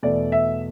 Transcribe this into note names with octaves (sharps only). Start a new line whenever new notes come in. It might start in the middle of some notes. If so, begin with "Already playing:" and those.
E2 B2 A3 D5
E5